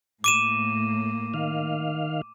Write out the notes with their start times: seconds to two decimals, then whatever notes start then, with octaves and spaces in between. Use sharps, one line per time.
0.24 A2 A#3 D6 D#7 E7
1.34 D#3 F5